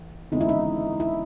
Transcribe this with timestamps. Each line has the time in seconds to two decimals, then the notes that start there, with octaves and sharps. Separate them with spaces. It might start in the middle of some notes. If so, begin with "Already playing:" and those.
Already playing: A1
0.32 G1 F2 C#3 E3 G#3 D#4
0.41 E4
0.49 D#4
1.00 E4